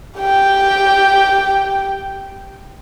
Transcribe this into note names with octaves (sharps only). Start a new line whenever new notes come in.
G4 G5